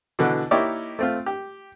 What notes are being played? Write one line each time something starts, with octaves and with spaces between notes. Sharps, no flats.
B2 D3 E3
A#3 D#4 E4 G4 C#5 D5
A3 C4 F4
G4